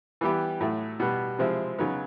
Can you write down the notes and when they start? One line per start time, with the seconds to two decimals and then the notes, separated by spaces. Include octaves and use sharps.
0.21 E3 G3 B3 E4 G4
0.60 A2 F#3 A3
1.00 B2 G3 B3
1.39 C3 F3 G#3 C4 E4
1.78 C#3 F#3 B3 D#4